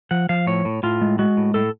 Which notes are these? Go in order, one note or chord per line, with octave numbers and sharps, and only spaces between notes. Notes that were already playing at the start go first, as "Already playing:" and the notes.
F3 F#5
F3 F5
A2 C#5
A2
A2 F4
G#3
G#3 F#4
A2
A2 A4